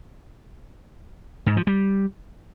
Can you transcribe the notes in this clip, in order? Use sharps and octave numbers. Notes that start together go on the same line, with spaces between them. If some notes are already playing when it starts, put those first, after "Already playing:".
G#2
F3
G3